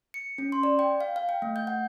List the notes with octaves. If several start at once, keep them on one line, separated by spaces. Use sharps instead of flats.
C#7
C#4
C6
D5
G5
F5
F5
G5
A3
G6
F#5